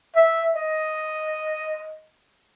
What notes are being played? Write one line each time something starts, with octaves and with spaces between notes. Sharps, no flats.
E5
D#5